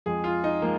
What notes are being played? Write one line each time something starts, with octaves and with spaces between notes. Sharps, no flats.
F2 F3 G#3 G#4
F4
D#4
F3 G#3 A#3